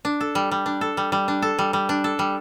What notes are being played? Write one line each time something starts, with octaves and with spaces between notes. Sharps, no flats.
D4
A4
G3
G3
D4
A4
G3
G3
D4
A4
G3
G3
D4
A4
G3